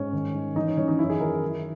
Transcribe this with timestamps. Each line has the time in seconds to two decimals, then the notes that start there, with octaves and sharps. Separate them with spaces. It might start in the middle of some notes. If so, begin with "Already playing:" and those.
Already playing: G#2 C#4
0.13 D#3
0.34 D#3
0.56 E3 D#4
0.67 C#4
0.77 E3 C#4
0.88 D#4
0.99 F#2 E4
1.09 G#4
1.20 D#3 A#4
1.42 D#3